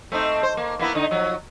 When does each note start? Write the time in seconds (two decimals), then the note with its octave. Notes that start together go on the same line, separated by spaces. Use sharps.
0.12 A3 C4 D#4
0.43 C5
0.57 A#3
0.79 A#3 B3 E4
0.95 D3 D#4
1.11 F3 F#3